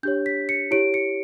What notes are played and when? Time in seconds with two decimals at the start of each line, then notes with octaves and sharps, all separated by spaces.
0.03 D4 G4 C#5 G6
0.26 B6
0.49 C#7
0.71 E4 G4 C#5 D7
0.94 C#7